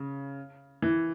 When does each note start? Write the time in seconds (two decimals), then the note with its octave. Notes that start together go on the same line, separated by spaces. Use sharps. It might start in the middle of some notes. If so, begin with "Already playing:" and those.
Already playing: C#3
0.82 E3